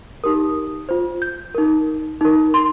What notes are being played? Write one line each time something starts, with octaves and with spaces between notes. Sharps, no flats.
D#4 G4 A#4 D#6
F4 C5
G6
D#4 A#4
D#4 A#4
C6